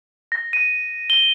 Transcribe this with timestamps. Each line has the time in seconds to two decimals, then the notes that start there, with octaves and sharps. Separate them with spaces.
0.32 A#6
0.53 D#7
1.10 G7